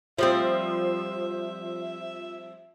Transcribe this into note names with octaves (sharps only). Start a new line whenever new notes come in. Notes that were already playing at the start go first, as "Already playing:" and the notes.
F3 G3 C4 E5